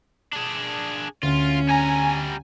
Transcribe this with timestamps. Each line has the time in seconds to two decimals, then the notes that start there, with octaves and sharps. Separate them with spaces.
0.33 D4 G#4
1.23 D2 C#4 F4
1.69 G3 G#5 A#5